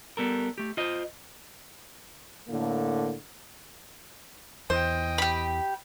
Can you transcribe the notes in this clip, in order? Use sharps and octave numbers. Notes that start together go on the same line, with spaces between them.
G3 B3 A4 A#4
A3 G4
F4 C5 D#5
A2 D3 A#3
E2 C5 D#5 G5
G4 B5